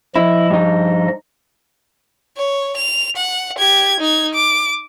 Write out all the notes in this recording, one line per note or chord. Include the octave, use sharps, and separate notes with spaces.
F3 E4 D#5
G2 D#4
C#5
F7
F#5
G4 G#6
D#4 G#6
D6